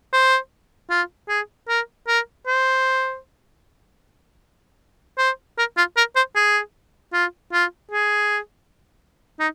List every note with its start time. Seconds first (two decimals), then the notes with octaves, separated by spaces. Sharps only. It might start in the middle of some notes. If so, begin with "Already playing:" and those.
0.13 C5
0.90 F4
1.28 G#4
1.68 A#4
2.07 A#4
2.46 C5
5.18 C5
5.58 A#4
5.77 F4
5.97 A#4
6.16 C5
6.35 G#4
7.13 F4
7.53 F4
7.91 G#4
9.39 D#4